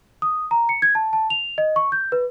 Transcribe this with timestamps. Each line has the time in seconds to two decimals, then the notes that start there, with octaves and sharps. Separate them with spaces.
0.22 D#6
0.51 A#5
0.69 C#7
0.82 G#6
0.95 A5
1.13 A5
1.30 F7
1.58 D#5
1.76 C#6
1.92 G6
2.12 B4